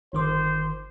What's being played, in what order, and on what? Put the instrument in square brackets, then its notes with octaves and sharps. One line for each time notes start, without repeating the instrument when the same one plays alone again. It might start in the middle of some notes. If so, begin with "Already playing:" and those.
[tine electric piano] G1 D#3 D6 [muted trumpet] C5